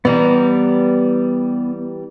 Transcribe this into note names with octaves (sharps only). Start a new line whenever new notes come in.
E3 G3 B3 A#5